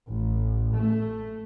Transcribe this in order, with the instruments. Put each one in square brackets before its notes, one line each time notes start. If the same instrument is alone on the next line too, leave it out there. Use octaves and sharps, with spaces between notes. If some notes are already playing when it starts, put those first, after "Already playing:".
[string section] A1
A3